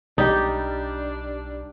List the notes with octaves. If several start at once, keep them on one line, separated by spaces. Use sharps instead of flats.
B1 G3 D4 D#4 G4